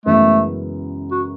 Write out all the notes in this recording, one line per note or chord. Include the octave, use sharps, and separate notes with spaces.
F#2 C#3 E3 G#3 A3 B3
F#4